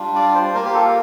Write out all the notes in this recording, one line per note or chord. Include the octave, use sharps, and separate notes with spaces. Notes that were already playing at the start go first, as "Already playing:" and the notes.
Already playing: G3 D4 F4
D5
C5
A#3 F4 A#4
G4
A4
F5